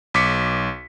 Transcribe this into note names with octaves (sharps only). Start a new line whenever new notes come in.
B1 D6 B6 C#7